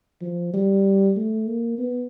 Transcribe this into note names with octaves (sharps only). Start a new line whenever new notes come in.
F3
G3
A3
A#3
B3